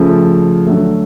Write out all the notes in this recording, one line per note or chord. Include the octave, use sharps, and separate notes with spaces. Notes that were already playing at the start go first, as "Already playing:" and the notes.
Already playing: C#3 F3 A3
D3 F#3 A3